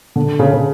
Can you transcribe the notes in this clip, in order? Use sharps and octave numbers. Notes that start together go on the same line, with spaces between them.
D3
C#3
C#3